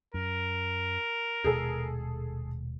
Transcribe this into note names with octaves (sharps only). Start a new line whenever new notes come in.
F#2 A#4
D#1 B2 G#3 G#4 A4